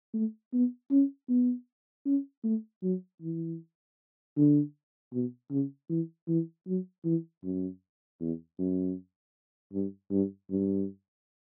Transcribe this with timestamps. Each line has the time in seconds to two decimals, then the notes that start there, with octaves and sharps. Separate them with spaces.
0.14 A3
0.53 B3
0.91 C#4
1.29 B3
2.06 C#4
2.44 A3
2.83 F#3
3.22 E3
4.37 D3
5.13 B2
5.51 C#3
5.90 E3
6.28 E3
6.67 F#3
7.05 E3
7.44 F#2
8.21 E2
8.59 F#2
9.73 G2
10.11 G2
10.50 G2